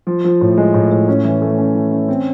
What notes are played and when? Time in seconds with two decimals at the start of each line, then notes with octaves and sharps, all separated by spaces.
0.07 F3
0.24 F3
0.41 A2
0.57 G#3
0.74 A2
0.91 A2
1.08 C#4
1.24 E3
1.42 A3
1.58 C#4
1.75 E3
1.92 C#4
2.08 C4